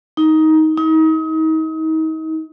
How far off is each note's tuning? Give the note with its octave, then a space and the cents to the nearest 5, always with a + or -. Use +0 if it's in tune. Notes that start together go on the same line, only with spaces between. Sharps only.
D#4 +15
D#4 +35